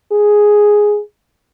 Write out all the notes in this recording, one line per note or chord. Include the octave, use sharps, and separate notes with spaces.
G#4